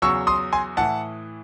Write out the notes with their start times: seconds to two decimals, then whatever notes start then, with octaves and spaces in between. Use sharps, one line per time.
0.02 E2 C#3 F#3 C#6 E6
0.27 C6 D#6
0.52 G#5 C6
0.77 A2 E3 F#5 A5